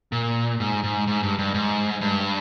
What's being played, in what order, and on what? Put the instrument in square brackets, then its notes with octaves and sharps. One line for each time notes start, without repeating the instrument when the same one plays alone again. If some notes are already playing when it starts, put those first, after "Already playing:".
[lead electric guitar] A#2
G#2
G#2
G#2
G2
G2
G#2
G2